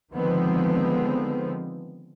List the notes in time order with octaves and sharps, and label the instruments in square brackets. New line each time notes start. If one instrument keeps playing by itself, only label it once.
[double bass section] D3 D#3 F3 G#3 B3 C4